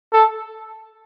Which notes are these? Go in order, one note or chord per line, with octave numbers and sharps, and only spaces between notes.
A4